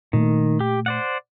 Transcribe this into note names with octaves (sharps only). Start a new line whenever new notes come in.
A#2 D#3 A3
G4
C5 D5 F#5